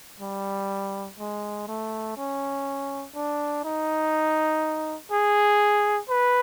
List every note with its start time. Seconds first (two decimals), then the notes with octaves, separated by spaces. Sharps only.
0.20 G3
1.19 G#3
1.68 A3
2.17 C#4
3.15 D4
3.64 D#4
5.12 G#4
6.09 B4